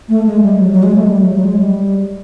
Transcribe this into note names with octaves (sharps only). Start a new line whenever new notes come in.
A3
G#3
G3
F#3
F#3
G#3
A3
G3
F#3
F#3
G#3
G3